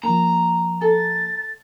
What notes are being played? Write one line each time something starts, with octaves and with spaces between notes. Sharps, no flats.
F3 A#3 A#5
A4 A6